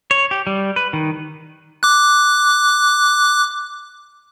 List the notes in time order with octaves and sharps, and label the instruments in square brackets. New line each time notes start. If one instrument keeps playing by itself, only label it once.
[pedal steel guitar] C#5
G4
G3
B4
D#3
[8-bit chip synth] D6 F#6